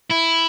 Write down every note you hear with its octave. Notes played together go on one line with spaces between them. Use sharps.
E4